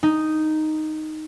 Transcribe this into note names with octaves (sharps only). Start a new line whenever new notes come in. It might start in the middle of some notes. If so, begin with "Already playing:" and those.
D#4